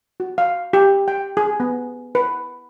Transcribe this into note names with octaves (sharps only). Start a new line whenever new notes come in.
F#4
F5
G4
G5
G#4
B3
B4